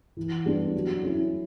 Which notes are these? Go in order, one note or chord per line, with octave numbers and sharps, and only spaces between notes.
E3
G3 B3 D4 G4
F#3
C#4 E4